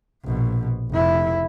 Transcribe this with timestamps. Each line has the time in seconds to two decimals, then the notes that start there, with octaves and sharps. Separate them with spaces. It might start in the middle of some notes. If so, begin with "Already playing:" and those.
0.24 A#1 B2
0.90 F1 E4